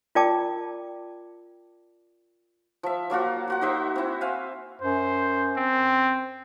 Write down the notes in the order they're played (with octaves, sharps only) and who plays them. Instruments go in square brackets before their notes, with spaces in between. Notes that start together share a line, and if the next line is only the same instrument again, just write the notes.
[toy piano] F4 A#4 D5 G5 A5 D6
[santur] F3 E5
F#3 A#3 F4 F#4
F4 F#4 F#5
D#4 F#4 C5 E5
C4 E4
C5 E5 F5 G#5
[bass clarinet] F#2 [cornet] C5
[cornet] C4